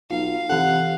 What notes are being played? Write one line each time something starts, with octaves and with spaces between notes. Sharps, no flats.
B1 F4 F5
C3 E3 A4 F#5